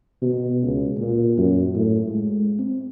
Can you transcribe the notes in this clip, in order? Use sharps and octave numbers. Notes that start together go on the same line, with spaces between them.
B2
C#2
A#2
F#2
A2
G#3
C4